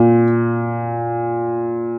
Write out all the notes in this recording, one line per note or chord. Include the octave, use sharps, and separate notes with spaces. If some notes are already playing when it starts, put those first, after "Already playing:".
Already playing: A#2